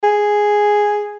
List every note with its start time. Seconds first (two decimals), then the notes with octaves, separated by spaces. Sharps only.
0.04 G#4